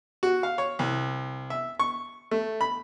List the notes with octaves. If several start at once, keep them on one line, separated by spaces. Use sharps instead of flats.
F#4
F5
C#5
C2
E5
C#6
A3
B5